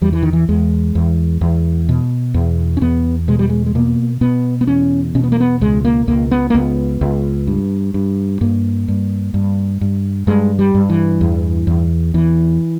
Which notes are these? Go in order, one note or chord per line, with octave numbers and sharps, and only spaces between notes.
E2 G3
E3
D#3
E3
E2 G#3
E2
E2
B2
E2
C#4
E2 B3
B2 G#3
G3
G#3
G#3
B2 A#3
B2 B3
B3
E2 C#4
B2 C#4
B3
A#3
B3
C#2 G#3
A#3
C#2 A#3
B3
A#3
C#2 B3
C#2
G2
G2
G2 A#3
G2
G2
G2
G2 G#3
G3
G2
E3
E2
E2
E2 E3